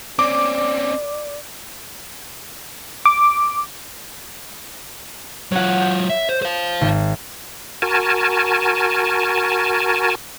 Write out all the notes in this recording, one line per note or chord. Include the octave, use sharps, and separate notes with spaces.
C4 C#4 D5 D6
D6
F#3 F4 C#5 F#5
G6
E5
C5
C5 F5
G#1
F#4 A#4 G#5 A5